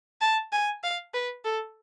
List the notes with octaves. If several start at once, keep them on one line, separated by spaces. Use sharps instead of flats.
A5
G#5
F5
B4
A4